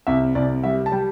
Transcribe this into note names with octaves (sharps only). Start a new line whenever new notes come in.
C2 E5
C2 D5
G3 E5
A5
G3 G5